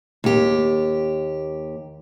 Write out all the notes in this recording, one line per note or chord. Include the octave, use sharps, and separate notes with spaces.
D#2 G4